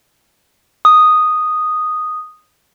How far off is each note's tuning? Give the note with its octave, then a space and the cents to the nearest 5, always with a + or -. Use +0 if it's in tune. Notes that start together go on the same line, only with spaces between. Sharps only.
D#6 -5